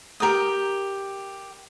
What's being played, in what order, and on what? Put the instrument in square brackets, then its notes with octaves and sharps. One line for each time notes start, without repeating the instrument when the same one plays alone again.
[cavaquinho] G4 A#4 G5 D#6